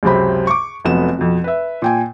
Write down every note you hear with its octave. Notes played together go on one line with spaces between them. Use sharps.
C#2 F#2 C3 C4 B5
C#6 D6
F1 F2 F#3 B3 E7
F2 B2
B4 E5
A#2 G5 G#5